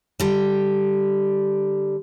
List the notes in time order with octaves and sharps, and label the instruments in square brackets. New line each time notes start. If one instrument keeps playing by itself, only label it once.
[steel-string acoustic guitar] D3 G3